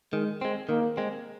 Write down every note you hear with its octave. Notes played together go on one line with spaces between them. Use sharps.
D#3 G#3
G#3 C4
D#3 A#3
G#3 C4